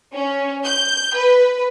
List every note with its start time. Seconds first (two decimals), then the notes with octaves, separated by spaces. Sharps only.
0.13 C#4
0.64 G6
1.15 B4